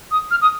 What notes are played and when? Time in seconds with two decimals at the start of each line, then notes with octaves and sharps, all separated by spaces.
0.11 D#6
0.31 F6
0.42 D#6